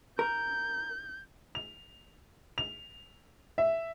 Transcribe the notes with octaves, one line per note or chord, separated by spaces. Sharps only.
A#4 G6
F7
F7
E5